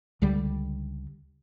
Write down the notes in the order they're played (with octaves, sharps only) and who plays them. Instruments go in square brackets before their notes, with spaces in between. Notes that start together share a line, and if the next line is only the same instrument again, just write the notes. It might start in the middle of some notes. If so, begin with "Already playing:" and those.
[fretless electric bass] C#2 D3 G3